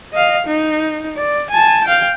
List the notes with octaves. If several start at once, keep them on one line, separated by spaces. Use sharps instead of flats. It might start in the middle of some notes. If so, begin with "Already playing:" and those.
D#5 F5
D#4
D5
G#5 A5
F5 G5